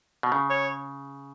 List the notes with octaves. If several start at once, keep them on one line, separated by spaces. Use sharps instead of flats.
B2
C#3
C#5